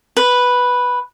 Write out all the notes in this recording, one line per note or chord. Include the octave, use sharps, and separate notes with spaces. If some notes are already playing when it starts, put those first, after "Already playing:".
B4